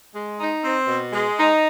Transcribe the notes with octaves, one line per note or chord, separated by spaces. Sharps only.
G#3
D#4
C4
B2
G#3
D#4